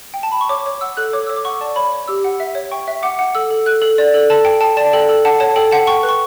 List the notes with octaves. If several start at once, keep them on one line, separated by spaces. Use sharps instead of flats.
G5
A5
B5
C#6
C#5 D6
C#5
F#5 E6
A4 F#6
C#5 D6
C#5 E6
D6
F#5 C#6
D5 A5
C#5 B5
C#5
G4 E6
F#5
E5
C#5
G5 C#6
E5
F#5 D6
F#5
A4 E6
A4
A4 F#6
A4
D5
A4
A4 A5
G5
G5 A5
D5 A5
A4 G5
A4
F#5 A5
C#5 A5
A4 G5
F#5 A5
G5 C#6
B4
C#6